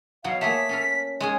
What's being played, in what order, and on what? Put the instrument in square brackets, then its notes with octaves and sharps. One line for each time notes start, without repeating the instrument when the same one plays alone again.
[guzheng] B2 F#3 [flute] F5
[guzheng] A3 A#3 G#4 [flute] B6
[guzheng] C#4 A4 A#4
G#3 C#4 G#4